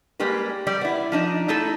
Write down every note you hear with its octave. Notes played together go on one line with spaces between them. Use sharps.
G3 G#3 A#3 G4 B4
G3 G4 D5
B3 E4
F3 D4 D#4
A3 D#4 E4 A4